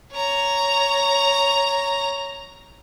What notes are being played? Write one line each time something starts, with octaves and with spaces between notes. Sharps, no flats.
C#5 A#5